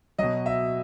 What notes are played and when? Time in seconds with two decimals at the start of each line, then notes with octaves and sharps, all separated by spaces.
0.18 B2 F#3 D#5
0.46 E5